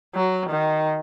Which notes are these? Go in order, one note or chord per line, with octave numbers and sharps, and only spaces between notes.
F#3
D#3